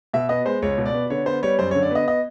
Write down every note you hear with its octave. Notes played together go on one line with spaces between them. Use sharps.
B2 E5
B3 D#5
G#3 C5
C#2 C#5
B2
D5
B3
D3 C#5
B3 C5
G3 C#5
F#2 C5
C#5
D3
D5
B3 D#5
D#5